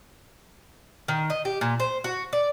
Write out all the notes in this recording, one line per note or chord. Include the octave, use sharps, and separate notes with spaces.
D#3
D#5
G4
A#2
C5
F#4
D5